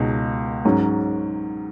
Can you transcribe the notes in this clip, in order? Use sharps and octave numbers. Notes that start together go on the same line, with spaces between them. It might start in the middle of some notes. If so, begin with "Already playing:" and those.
Already playing: C#2 B2 G#3 D#4
G#2 F#3 C#4